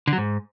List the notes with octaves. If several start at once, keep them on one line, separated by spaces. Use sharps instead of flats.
D3
F#3
G#2